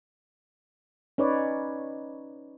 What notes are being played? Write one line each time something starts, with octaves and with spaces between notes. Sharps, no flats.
C#4 D#4 B4 C#5 D5